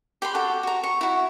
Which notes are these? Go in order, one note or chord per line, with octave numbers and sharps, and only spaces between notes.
G4 B5 C6
F#4 G4 A4
F#4 A#5
C#6
E4 F#4